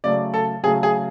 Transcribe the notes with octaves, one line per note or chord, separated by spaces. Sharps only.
C#3 F#3 A3 D5
A4
C#3 F#3 A3 G#4
G#4